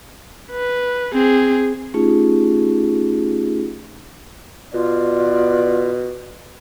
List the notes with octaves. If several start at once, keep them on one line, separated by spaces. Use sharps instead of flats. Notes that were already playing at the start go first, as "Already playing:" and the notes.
B4
C4 G#4
A3 C#4 D#4 F4 G4 G#4
B2 B3 F4 D5